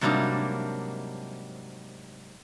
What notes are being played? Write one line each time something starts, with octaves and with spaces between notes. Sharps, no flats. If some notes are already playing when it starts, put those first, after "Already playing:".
G#2 C3 F#3 G3 A#3 D4